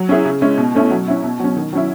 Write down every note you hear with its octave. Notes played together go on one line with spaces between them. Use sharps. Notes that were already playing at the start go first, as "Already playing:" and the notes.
Already playing: F#3
C#4 E4 G#4
C#3
G#3 C#4 E4
B2
A3 C#4 E4
F#3
C#4 E4
B2
F#3 C#4
D#3
F#3 C#4 E4